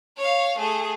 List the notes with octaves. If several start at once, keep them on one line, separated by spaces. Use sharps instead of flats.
C#5 F5
A3 G#4